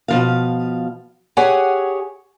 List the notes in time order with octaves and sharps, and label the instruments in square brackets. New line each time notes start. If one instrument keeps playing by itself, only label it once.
[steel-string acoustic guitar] B2 F3 F5
G4 G#4 C#5 F#5 G#5